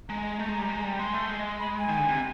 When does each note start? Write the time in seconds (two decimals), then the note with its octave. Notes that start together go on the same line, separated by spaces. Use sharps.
0.08 G#3 A#5
0.39 A3
0.49 G#3
0.59 G3
0.69 G#3
0.84 G3
0.98 G#3 C6
1.14 A3
1.29 G#3
1.59 B5
1.78 G#5
1.89 D#3
1.99 D3
2.08 C3